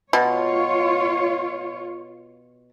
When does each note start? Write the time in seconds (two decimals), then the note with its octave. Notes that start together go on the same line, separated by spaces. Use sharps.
0.13 B2 F4 C#5